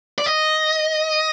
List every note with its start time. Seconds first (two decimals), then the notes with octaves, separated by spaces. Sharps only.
0.18 D5
0.26 D#5